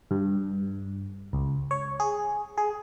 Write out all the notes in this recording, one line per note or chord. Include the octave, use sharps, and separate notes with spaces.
G2
C#2
C#5
G#4
G#4